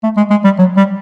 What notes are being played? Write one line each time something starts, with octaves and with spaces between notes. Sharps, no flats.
A3
G#3
G#3
G3
F#3
G3